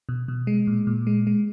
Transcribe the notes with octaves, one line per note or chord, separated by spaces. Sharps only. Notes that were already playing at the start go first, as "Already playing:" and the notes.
B2
B2
G#3
A#2
A#2
G#3
G#3